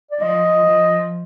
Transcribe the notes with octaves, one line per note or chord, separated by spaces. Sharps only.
D5
F3 D#5
F3